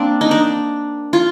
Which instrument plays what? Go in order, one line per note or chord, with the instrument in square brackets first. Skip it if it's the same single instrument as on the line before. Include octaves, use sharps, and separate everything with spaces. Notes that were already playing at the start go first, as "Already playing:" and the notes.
Already playing: [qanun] A#3 C4 D4
D#4
D4
F4